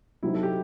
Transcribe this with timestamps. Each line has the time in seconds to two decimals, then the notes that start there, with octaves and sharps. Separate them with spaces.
0.23 C3 F#3 C4 D#4 E4
0.34 A4
0.43 G4